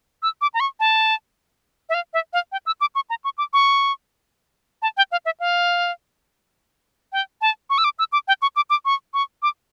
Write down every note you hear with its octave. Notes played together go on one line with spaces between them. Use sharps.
E6
D6
A#5
C#6
A5
E5
F5
E5
F5
G5
E6
D6
C#6
A#5
C#6
D6
C#6
A5
G5
F5
E5
F5
G5
A5
C#6
E6
D6
E6
D6
G5
C#6
D6
D6
C#6
C#6
D6